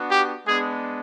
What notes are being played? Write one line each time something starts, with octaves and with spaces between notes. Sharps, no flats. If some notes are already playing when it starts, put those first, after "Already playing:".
Already playing: B3 D4 F#4
G4
G#3 B3 D4 G#4